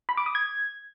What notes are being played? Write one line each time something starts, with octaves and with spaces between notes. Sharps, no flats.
B5
D6
D#6
G#6